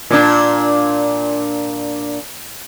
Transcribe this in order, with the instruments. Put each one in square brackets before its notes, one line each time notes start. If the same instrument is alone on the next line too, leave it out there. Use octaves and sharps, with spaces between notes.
[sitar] A#2 D4